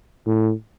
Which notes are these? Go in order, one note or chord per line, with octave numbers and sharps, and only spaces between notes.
A2